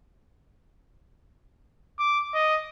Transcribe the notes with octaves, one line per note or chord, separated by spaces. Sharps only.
D6
D#5